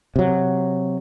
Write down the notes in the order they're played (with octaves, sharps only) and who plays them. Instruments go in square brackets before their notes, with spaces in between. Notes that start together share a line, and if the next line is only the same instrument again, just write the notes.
[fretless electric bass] C3 F#3